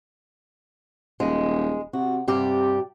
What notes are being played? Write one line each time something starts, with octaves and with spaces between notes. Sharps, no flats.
D#1 G#3
C3 F#4
G2 C3 G4 D5